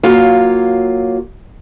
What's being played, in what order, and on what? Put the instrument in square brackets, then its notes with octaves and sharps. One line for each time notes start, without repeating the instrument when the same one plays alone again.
[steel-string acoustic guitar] F#3 A#3 F4 C#5